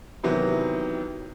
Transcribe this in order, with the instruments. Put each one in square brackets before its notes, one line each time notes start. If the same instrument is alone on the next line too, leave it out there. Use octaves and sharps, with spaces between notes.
[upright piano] C3 D#3 E3 F#3 B3